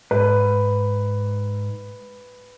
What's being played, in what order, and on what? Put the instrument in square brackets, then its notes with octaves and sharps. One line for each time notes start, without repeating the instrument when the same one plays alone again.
[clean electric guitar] G#2 [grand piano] B4